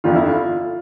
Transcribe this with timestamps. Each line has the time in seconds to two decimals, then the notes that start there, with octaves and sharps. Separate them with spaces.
0.04 G1 F2 D3 F4
0.16 E4
0.27 F4